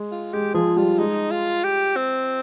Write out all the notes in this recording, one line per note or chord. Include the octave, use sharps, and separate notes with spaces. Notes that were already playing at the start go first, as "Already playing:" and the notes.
Already playing: G#3
F4
G#3 G4
F3 G#4
G3 F4
G#3 D#4
F4
G4
C4